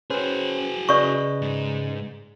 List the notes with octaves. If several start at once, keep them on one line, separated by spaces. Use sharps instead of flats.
C#4 F#4 G#4 B4 C5
C#3 B4 D5 D#5 C#6
G#2